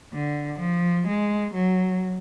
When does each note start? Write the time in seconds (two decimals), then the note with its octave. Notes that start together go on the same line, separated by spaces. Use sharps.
0.13 D3
0.60 F3
1.08 G#3
1.55 F#3